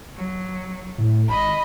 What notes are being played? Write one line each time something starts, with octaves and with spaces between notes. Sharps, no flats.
F#3
A2
G#1 D#5 B5